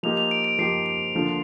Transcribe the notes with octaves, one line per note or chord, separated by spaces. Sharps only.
F3 A#3 D#4 G4 F7
F7
D7
D7
F3 A#3 D#4 G4 C7
D7
D3 F3 A#3 F4